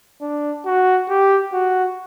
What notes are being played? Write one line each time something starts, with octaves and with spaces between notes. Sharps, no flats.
D4
F#4
G4
F#4